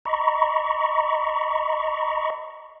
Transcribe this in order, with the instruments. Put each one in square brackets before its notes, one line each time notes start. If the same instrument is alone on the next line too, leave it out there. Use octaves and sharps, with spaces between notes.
[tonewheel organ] D#5 A#5 B5 C#6